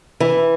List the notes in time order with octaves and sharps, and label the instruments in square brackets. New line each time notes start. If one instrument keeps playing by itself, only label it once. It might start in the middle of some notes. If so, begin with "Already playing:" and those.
[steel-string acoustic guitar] E3